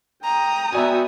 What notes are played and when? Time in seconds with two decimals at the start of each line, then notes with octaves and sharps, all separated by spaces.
0.24 G5 A#5 D#6
0.72 B3 F#4 D5 E5 G#5